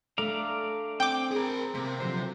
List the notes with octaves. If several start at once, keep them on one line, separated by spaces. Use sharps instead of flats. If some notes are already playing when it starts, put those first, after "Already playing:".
A3 D4 D5 F5 A#5
C4 G5 D6
G#4 A#4
C3 A#3
D3 F3 F#3 C5